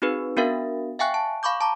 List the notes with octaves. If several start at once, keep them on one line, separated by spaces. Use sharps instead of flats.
C4 D#4 F#4 G#4 B4
B3 D4 F#4 A#4 E5 F5
E5 F5 G5 G#5 C#6 F#6
A5
F5 B5 C#6 D6 G6
A5 A#5 D6